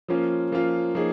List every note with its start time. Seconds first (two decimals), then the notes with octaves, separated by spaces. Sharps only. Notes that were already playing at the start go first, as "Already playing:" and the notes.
0.08 F3 A#3 C#4 F4
0.52 F3 A#3 C#4 F4
0.95 F3 A#3 D#4 G#4 C#5